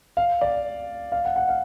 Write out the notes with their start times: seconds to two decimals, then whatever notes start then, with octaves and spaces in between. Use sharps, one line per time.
0.17 F5
0.41 D5
1.12 F5
1.25 F#5
1.36 F#5
1.49 F5